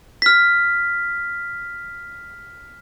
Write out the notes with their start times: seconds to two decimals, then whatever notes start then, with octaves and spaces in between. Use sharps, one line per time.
0.22 F6 B6